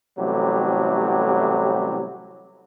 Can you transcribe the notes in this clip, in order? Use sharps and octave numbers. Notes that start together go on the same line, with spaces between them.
A1 A2 C3 F#3 G3 G4